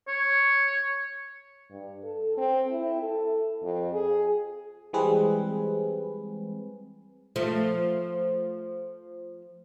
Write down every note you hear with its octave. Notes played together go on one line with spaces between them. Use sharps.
C#5
G2
A4
C4
E4
A4
F2
G#4
E3 G3 G#3 C4 G#4 B4
F3 A3